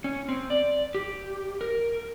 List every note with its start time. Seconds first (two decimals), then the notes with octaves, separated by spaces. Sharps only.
0.04 C#4
0.29 C4
0.50 D5
0.95 G4
1.61 A#4